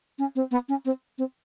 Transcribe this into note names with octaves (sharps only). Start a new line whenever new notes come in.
C#4
C4
B3
C#4
C4
C4